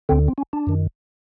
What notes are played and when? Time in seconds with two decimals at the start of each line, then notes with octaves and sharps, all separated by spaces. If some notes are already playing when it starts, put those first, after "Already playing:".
0.09 D2 D3 C4
0.28 C4
0.38 C#4
0.53 D4
0.67 F#2 D#3